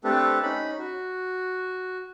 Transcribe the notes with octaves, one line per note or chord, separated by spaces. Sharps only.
A3 C4 D4 G4 A4 B4
C#4 D#4 B5
F#4